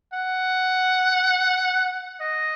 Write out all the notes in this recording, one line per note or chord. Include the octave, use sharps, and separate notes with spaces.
F#5
D#5